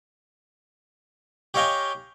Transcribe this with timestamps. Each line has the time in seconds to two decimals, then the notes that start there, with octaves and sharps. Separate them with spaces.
1.54 G4 C#5 D#5 F5 G5 G#5